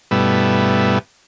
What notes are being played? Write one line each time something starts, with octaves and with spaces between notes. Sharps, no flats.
G2 B2 G3 A3 B3 E4